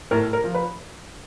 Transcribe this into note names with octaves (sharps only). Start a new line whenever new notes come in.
A2 A#4
A#4
F3
B4